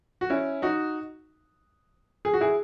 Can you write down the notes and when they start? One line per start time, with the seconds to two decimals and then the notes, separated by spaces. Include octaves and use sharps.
0.21 F#4
0.30 C#4 E4
0.62 D#4 F#4
2.25 G#4
2.34 F#4
2.41 E4 G#4